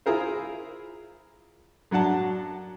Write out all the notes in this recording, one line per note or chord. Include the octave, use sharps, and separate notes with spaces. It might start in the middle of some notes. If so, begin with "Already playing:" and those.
E4 F4 G#4 A#4 C5
F#2 F#3 D4 F#5 A5